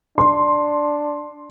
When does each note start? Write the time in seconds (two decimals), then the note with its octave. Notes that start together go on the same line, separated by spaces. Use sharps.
0.18 D4 C6